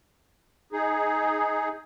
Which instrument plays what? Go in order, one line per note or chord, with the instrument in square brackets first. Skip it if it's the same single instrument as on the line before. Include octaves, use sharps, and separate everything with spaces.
[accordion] D#4 G#4